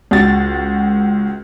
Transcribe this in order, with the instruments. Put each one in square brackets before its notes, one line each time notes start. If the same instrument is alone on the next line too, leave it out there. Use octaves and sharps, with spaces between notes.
[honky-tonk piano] C#2 F#4 A6